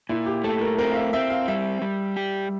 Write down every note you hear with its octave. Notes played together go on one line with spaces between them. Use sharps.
A#2 E4
G4
A3 A4
A#4
C4 A#4
F5
E5
C4 E5
F5
G3 E5
G3
G4